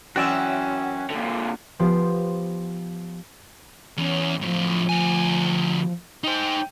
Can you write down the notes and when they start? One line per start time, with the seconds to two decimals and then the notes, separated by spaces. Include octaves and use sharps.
0.16 F#2 E3 C4 C#4 F#4 D5 E5
1.10 A#2 D3
1.79 F3 B3 G4 C5
3.98 E2 C#4
4.42 D2 A2 F3
4.89 D2 G#5
6.24 D#4 C5 G5